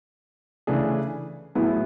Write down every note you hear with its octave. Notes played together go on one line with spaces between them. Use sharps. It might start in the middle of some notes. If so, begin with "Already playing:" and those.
C#3 E3 A3 D4 G#4
A2 F#3 B3 E4 G#4